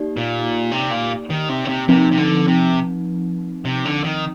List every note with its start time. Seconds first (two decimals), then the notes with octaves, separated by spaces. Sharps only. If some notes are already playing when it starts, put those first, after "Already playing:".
Already playing: A#3 D#4 G4 D5
0.17 A#2
0.71 C3
0.91 A#2
1.30 D#3
1.49 C3
1.65 D3
1.69 C3
1.88 C3 F3 C4 D#4
2.12 C3
2.18 D3
2.48 C3
3.65 C3
3.85 D3
4.04 D#3